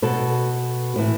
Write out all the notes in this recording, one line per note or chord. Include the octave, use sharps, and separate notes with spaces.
B2 A4
A2 E3